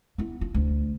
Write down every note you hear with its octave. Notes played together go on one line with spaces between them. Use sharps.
B3 E4
F4
D2